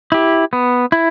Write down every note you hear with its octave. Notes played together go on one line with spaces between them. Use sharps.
E4 G4
B3
E4